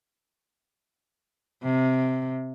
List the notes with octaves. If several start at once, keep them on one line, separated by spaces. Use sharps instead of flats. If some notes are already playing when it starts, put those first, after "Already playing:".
C3